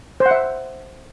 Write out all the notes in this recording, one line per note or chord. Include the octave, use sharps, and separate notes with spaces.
C5
F#5
E5